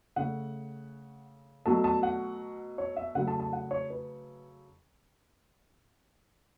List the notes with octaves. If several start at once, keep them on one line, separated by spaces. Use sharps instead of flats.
C#3 A3 F#5
B2 F#3 A3 A5
A5
F#5
C#5
E5
C#3 F#3 A3 F#5
A5
A5
F#5
C#5
B4